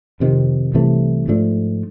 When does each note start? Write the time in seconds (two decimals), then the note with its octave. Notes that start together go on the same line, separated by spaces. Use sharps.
0.20 F2 C3 D#3
0.74 C2 C3 E3 A3
1.28 G#2 F3 A3 D4